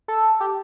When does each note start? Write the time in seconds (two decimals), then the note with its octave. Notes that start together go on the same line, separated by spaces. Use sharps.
0.08 A4
0.40 G4